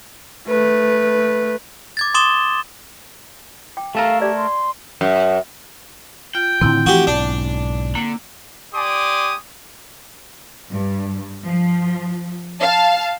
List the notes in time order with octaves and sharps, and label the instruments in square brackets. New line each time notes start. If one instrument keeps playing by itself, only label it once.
[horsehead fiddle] A3 B4
[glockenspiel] D6 G#6 A6
C6 D6 D#6 A6 E7 G7
[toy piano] G5 D6
[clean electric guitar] A3 A4 A#4 [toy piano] G4 A5 A#5 [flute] F5
[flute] G4 [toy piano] D5
[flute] C6
[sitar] F#2
[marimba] F4 [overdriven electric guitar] G5
[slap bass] A2 D3 D#3 [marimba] C4 E4
[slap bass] E3 F3 A3 [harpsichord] F#4 G4
[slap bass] B1 G#2 [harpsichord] D4 [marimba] D5
[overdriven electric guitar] D3 [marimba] A#3
[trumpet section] G4 D5 G#5 C6 D6 D#6
[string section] G2
F3
F5 A5